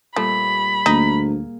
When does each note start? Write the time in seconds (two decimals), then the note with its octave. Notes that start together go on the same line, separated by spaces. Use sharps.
0.16 A#2 F3 G3 A3 B5
0.86 D2 A#3 D#4 G#4